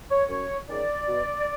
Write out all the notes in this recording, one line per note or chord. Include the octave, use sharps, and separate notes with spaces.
C#5
F#2 C#5
D#3 G#3 C#4 D5
B2